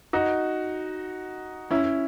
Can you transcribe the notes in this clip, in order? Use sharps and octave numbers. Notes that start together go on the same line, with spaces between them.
D#4 F#4
C#4 E4